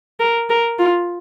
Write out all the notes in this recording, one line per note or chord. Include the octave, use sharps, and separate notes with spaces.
A#4
A#4
F4